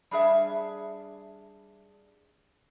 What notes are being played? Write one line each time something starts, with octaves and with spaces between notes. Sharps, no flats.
G3 D4 G#4 E5